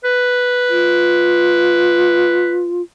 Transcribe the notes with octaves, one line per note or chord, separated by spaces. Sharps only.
B4
F4